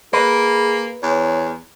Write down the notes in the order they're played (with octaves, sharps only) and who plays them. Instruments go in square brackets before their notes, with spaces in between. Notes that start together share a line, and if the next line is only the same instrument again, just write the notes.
[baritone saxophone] A#3 [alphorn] G#4 [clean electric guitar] B4
[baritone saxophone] E2 [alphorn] C#5